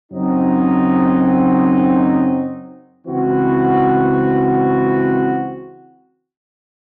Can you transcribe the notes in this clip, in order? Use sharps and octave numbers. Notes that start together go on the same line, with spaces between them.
F#2 C#3 F#3 C4 D#4
C#2 C#3 E3 C4 F#4